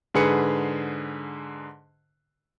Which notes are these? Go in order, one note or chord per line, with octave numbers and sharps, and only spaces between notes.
G#2 D3 G#4 B4 C#7